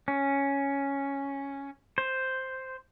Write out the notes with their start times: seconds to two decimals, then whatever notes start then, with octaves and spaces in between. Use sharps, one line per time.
0.08 C#4
1.98 C5